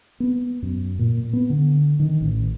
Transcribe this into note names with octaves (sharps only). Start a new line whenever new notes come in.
B3
F#2
A#2
B3
D3
D#3
A1